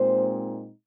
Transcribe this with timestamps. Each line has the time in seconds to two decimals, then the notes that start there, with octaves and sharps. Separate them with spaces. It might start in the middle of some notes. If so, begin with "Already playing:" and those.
Already playing: A#2 G#3 C4 D#4 C5